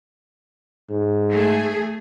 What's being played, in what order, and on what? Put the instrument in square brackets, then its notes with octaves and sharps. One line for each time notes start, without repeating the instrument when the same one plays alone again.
[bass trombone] G#2
[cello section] A3 G#4